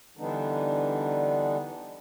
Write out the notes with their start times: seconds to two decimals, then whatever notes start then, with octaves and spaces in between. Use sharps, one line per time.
0.17 D3 E3 G3 B3 D4 D#4